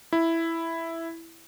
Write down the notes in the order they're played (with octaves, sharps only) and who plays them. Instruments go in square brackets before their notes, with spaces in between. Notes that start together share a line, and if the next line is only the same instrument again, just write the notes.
[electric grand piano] E4